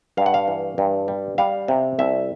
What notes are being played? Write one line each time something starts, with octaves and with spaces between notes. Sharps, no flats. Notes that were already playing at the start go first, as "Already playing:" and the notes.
G2 F5
F#5
F5
E3
G2
G3
G3 F5
C3
C2 E5